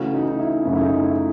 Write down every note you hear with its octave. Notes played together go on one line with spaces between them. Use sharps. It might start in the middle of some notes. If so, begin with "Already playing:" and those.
Already playing: C#3 E3 A3 C#4 F#4
D#4
D#4
E4
F#2 C#3 F#3 A3 C#4 E4
E4
D#4
E4